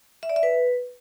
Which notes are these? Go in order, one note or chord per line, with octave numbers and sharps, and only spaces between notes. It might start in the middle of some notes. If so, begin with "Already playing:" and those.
E5
D5
E5
B4